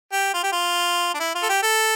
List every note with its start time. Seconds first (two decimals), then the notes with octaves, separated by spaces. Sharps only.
0.12 G4
0.34 F4
0.43 G4
0.52 F4
1.15 D4
1.20 E4
1.35 F4
1.43 A4
1.49 G4
1.63 A4